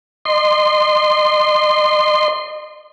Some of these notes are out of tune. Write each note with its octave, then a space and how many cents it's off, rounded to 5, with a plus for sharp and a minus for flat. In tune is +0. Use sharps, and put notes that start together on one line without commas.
D#5 -35 C6 -10